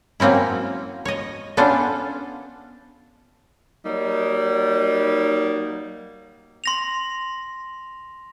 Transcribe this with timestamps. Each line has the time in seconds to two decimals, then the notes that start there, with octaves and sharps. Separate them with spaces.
0.20 F#3 A#3 C4 C#4 E4
1.05 C#5 D#5
1.57 B3 C#4 D4 F4 A4 C5
3.84 F#3 G3 A#3 D#4
6.64 C6 A#6 F7